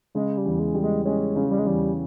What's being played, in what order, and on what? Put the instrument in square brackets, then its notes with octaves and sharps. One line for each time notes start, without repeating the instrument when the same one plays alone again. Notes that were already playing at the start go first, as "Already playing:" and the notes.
[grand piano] C#3 [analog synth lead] G#3
[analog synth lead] G3
[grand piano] E2
[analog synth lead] G#3
[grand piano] G3
[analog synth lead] G#3
[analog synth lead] G#3 [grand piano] C#4
[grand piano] C#3
[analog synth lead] G3
G#3
[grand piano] E2 [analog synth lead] G3